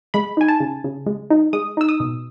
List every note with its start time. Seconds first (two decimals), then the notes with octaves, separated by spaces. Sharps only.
0.14 G#3 B5
0.37 D#4 G#5
0.48 A5
0.60 C#3
0.84 C#3
1.06 G#3
1.30 D#4
1.53 G#3 D#6
1.77 D#4 E6
1.89 D#6
2.00 B2